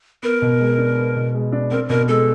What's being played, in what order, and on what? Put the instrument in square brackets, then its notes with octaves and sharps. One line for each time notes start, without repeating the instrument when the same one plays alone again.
[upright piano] B3 [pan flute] A#4
[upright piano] B2
G#3
D4
B3
B2
G#3
D4
[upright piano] C4 [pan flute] A#4
[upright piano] B2 [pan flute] A#4
[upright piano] G#3 [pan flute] A4